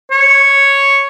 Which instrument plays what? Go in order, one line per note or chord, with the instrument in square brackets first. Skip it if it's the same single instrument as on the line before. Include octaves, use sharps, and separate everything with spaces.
[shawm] C#5